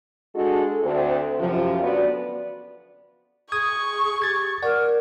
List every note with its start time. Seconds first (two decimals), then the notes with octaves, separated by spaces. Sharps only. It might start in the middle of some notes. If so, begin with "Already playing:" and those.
0.36 G#3 D4 F#4 A4
0.83 D2 C4
1.40 F#2 C3 F3
1.82 D2 B3 F#4 D5
3.52 G#4 C#6 D#6 G#6
4.22 G4 G#6 A6
4.63 A#4 D5 F#5